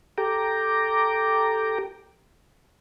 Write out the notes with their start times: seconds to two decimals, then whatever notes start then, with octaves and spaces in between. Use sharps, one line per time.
0.18 G4 A4 G5 A#5 D6